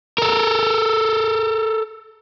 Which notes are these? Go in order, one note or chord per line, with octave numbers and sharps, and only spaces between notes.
A4 A#4